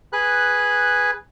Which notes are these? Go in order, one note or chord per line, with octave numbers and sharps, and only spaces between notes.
G#4 B4 F#6